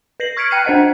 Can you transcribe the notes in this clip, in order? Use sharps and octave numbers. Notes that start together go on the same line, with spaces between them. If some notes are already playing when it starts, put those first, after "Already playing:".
B4 A#6 C7 F#7
C#6 F6 G#6 B6 C#7 D7
G5 F6 F#6 C7 C#7 D#7
D4 C5 D#5 F#5